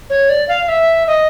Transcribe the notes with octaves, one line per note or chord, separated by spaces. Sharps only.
C#5
D5
F5
E5
D#5